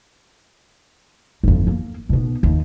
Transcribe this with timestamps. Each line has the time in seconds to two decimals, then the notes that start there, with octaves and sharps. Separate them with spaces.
1.43 G1 F2
1.67 A#3
2.09 B1 B2
2.43 D#2